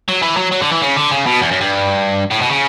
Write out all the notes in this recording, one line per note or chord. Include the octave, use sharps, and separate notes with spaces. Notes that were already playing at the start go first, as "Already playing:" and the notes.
F#3
E3
F#3
F#3
D3
E3
C#3
D3
C#3
B2
E2
F#2
G2
A2
B2
C#3